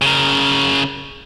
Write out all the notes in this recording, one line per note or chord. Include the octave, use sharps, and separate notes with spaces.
C#3 A#4